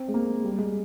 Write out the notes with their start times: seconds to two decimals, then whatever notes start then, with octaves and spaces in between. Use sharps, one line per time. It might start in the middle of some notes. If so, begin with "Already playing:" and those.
Already playing: C4
0.08 G#3
0.14 A#3
0.44 G3
0.59 G#3